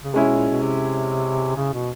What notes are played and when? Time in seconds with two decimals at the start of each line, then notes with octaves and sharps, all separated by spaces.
0.04 C#3
0.14 C3 G#3 C#4 E4
0.26 B2
0.38 A#2
0.50 B2
0.62 C3
1.56 C#3
1.73 B2